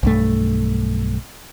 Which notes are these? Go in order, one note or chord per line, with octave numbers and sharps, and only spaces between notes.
B1 G2 A3